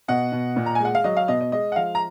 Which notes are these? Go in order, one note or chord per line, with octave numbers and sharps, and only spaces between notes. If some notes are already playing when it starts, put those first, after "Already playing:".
B2 D#5 F#5
B2
A#2
A#5
G#5
G#3 F#5
F5
F#3 D#5
F5
B2 D#5
D#5
G#3 D#5
F#5
F3 F5
A#5